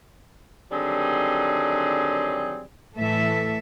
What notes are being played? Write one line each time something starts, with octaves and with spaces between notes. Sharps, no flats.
D3 D#3 F#3 G3 C4 G#4
A2 E3 A3 A4 E5